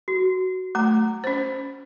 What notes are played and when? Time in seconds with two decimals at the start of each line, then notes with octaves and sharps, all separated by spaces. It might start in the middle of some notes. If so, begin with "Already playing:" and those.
0.08 F#4
0.75 A3 A#5 D6
1.24 C#4 C5